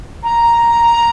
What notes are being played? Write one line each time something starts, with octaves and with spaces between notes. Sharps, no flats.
A#5